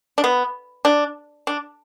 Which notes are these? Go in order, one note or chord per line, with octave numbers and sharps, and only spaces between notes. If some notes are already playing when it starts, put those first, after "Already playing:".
D4
B3
D4
D4